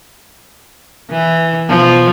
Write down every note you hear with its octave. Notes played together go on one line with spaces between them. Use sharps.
E3
B2 F3